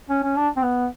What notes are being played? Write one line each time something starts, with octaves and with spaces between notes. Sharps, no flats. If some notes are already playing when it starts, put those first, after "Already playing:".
C#4
C#4
D4
C4
B3